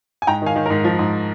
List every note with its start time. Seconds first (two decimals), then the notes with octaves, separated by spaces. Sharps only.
0.22 G#5
0.27 G#2 G5 A#5
0.42 D#3 F5 G#5
0.56 D#3
0.66 G#2 A#4
0.84 F3
0.99 G#2